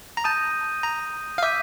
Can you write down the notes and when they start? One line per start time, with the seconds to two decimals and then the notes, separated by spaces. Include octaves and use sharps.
0.17 A#5
0.24 A5 D#6 G6 A#6 D#7
0.83 A#5
1.38 F5
1.43 E5 D6 G6 B6 D#7